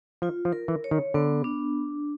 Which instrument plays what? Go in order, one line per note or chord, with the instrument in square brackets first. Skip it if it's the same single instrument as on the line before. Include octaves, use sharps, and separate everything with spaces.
[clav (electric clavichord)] F3 [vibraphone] F4
[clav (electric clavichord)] F3
[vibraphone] A#4
[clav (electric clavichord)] E3
[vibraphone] C#5
[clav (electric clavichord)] D#3
[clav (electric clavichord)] D3 [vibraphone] B3
[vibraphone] D4